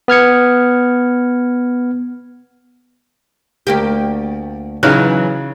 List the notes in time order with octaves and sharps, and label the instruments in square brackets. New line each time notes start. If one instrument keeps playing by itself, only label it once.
[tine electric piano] B3 F6 G#6 C#7
[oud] D2 A#3 G4
[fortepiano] C#3 F6 F#6 [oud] E3 F#3 D#4